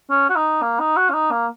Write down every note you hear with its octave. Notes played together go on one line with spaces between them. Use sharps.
C#4
F#4
D#4
A#3
D#4
F#4
C#4
D#4
A#3